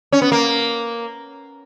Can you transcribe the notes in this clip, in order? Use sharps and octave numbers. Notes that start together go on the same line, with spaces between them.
C#4
B3
A#3